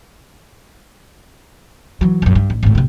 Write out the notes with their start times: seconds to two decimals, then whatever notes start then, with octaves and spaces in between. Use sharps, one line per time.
2.01 E3 F#3
2.22 A#1 F#2
2.35 G2
2.50 A1
2.63 G#1 A2
2.75 A1 C3